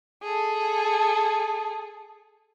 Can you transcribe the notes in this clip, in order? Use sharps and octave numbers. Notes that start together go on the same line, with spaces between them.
G#4 A4